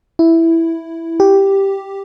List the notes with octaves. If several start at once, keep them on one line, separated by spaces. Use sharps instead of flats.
E4
G4